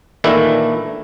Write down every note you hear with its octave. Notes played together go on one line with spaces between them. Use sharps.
A#2 D#3 E3 A3 D4 E4